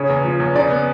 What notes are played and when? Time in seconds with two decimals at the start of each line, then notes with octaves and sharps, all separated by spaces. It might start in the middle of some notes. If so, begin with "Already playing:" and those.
Already playing: C#3 C#5
0.09 E2
0.24 F3
0.40 E2
0.55 C#3 D5
0.71 B3